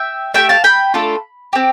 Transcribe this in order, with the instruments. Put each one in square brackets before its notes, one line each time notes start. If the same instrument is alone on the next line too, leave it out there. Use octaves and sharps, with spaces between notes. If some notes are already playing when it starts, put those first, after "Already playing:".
Already playing: [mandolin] E5 G5
A3 E4 G4 E5 G5
F5 A5
G5 B5
A3 D4 F4 A4
C4 G4